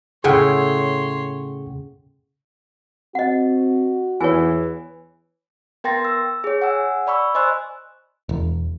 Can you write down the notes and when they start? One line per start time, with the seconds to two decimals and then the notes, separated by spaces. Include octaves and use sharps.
0.24 A2 C#3 E4 G#4 C#5 F#5 G5 C6
3.15 C4 F#4 D#5 F#5
4.21 E2 E3 C#5 G#5
5.84 B3 A#4 G5 C6 A6 A#6
6.05 E6
6.44 G#4 C#5
6.62 F#5 G#5 E6
7.07 D5 B5 C#6 E6
7.35 C5 D#5 G#5 C6 E6 F#6
8.29 E1